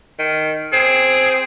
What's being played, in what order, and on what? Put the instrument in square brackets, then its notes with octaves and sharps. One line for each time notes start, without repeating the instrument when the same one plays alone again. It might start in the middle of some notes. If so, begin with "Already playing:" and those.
[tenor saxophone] D#3
[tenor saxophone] C4 [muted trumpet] G#4